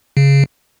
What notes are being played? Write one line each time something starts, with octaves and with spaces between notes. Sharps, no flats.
C#3